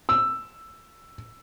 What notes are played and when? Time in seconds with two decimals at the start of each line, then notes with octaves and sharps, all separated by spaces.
0.09 E6